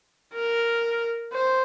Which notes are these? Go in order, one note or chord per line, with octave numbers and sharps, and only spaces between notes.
A#4
C5